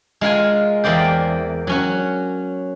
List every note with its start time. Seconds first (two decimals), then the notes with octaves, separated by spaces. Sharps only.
0.21 G#3 F4 A#4 G#5
0.84 E2 A#3 C5 D5 G5
1.67 F#3 C#4 F#4